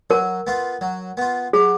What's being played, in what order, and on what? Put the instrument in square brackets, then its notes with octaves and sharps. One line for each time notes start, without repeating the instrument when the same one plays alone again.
[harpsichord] F#3 [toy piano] A#4
[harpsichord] B3 F4
F#3
B3 F4
[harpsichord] F#3 [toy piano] G#4